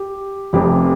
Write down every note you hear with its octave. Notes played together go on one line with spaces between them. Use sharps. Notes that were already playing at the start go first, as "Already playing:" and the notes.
Already playing: G4
F1 F2 C3 G4